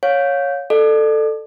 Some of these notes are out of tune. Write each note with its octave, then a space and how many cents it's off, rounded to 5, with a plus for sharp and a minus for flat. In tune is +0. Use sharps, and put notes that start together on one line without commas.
C#5 +0 F5 +25
A4 +5 D5 +40